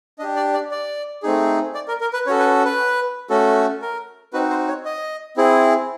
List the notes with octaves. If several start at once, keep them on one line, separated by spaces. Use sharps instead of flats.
D4 G4 D#5
D5
D5
D5
A3 C4 D#4 G#4
D5
A#4
A#4
B4
C#4 F#4 A4 C#5
B4
B4
A3 C#4 F#4 A4
A#4
C4 D#4 F#4 B4
C5
C#5
D#5
C4 E4 G#4